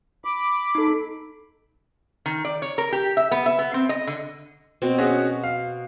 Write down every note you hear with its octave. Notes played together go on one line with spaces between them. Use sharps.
B5 D6
D#4 A4
D#3
D5
C#5
A#4
G4
E5
B3
E5
B3
C4
D#5
D3
B2 C4
C#4 F#4 G#4
F5